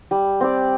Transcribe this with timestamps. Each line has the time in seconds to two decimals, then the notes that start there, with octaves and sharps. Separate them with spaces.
0.11 G3
0.41 C4 G4 D5